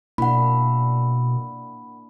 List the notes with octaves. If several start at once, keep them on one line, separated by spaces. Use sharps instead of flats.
B2 A#3 D4 E4 F#5 B5